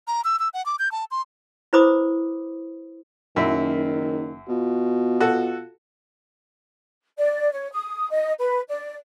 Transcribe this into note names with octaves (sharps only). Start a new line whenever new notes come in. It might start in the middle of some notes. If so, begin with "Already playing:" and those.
A#5
E6
E6
F#5
D6
G6
A5
C6
E4 B4 C5 B5 D6 D#6
F#1 F#2 D#3 E4
B2 F4
F#4 A4
D5
C#5
D#6
D#5
B4
D5